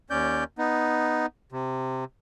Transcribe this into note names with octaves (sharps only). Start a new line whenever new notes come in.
D#2 C#4 D5 G6
B3 D#4
C3